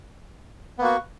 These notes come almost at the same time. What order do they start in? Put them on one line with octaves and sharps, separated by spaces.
B3 A#3 F#4